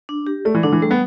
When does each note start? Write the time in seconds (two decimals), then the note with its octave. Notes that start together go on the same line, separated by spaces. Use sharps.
0.09 D4
0.27 G4
0.45 A3 D5
0.55 E3
0.63 D3 D4
0.72 E3
0.82 G3 A3
0.91 B3